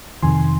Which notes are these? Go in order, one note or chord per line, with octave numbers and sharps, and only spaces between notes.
F2 C3 D#3 G#5 C6